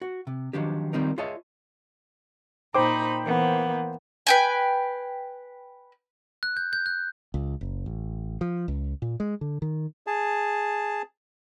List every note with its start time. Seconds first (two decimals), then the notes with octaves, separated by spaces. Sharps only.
0.02 F#4
0.27 C3
0.53 D#3 F3 F#3 D4 G4
0.93 D#3 F3 G3 C4 D#4 A#4
1.18 F4 G#4 C#5 D#5 E5 A5
2.74 A#2 D#4 C5 G5 B5 D6
3.24 E3 A#3 B3
4.27 B4 G5 G#5
6.43 F#6
6.57 G6
6.73 G6
6.86 F#6
7.34 C#2
7.61 F#1
7.86 A1
8.41 F3
8.68 C#2
9.02 A#2
9.20 G#3
9.41 D3
9.62 D#3
10.07 G#4 A5